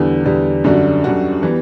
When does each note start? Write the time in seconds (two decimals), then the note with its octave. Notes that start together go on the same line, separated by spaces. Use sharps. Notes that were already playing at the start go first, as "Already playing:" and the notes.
Already playing: E2 D3 G3
0.25 E2 D3 G3
0.64 F#2 D3 G3 D4 F#4
1.04 F#2 D3 G3 D4 F#4
1.43 E3 G3 B3